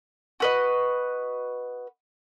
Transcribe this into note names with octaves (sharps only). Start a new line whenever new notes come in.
F#4 B4 D#5